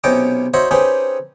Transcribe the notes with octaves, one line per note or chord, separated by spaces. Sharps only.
B1 C3 C#4 D#5 G5 D6
D#4 F#4 C5 C#5 D#5 E5
C4 C#4 D#4 G4 G#4 B4